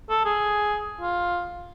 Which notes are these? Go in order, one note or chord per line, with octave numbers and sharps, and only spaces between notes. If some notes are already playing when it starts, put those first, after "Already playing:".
A4
G#4
F4